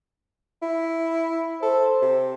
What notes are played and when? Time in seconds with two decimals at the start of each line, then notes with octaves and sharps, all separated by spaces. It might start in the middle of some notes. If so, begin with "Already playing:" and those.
0.62 E4
1.62 A4 C5
2.02 C3